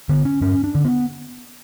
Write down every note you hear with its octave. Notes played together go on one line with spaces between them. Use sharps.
D3 B3
C#4
G2 C#4
D4
D3
B3